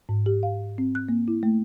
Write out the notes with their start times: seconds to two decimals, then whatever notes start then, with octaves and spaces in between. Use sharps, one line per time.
0.09 G#2
0.26 G4
0.43 F5
0.78 C4
0.95 F#6
1.09 A#3
1.28 E4
1.43 A3